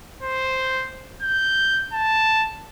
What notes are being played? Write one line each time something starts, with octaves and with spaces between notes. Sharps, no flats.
C5
G6
A5